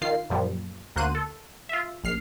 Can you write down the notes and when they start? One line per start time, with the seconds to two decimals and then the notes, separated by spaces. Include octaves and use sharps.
0.02 D#3 F4 F5 C7
0.30 F#2 A#2 F3 G3
0.96 D2 A#3 F#4 C5 F#6 D#7
1.15 A4
1.69 F4 E5
2.04 A#1 F6 C7